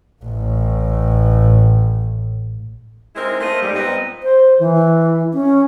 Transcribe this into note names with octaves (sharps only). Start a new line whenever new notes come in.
A1 A2
G#3 C4 D#4 E4 A#4
A3 A#3 C5 D#5
G#2 G3
A#2 B3 C4 D#5
C5
E3
C#4